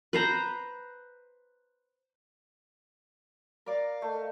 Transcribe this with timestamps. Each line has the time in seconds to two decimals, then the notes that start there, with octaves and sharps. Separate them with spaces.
0.13 B4 C5 A#5
3.66 A#4 D5 F5
4.02 A3 D#5